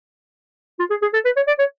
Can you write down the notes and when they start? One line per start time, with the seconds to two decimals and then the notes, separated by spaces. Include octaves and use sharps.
0.79 F4
0.90 G#4
1.02 G#4
1.14 A4
1.25 B4
1.36 C#5
1.47 D5
1.59 C#5